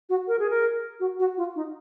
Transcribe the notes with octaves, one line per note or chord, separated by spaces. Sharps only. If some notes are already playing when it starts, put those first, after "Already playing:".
F#4
A#4
G#4
A#4
F#4
F#4
F4
D#4